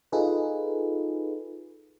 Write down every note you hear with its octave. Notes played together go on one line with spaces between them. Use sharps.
D#4 F4 G#4 A4 B4